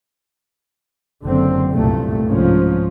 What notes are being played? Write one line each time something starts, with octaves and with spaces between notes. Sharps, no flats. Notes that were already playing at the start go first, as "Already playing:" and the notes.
F#1 D3 C4
C2 G2 A#2 A3
C2 G#2 F3 C#4